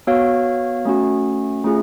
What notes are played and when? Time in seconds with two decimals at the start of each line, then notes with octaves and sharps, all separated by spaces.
0.07 B3 F#4 C#5 F5
0.85 A3 C#4 F#4
1.64 A3 C#4 F4 G#4